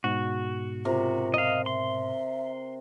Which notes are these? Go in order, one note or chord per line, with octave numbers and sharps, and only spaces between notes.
G#2 B2 F#4
C3 F4 A#4
D#5 F5
E5 C6